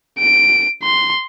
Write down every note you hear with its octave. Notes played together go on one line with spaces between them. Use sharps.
D7
C6